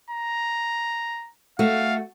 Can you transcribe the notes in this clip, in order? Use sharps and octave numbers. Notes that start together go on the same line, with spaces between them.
A#5
A3 F#4 F5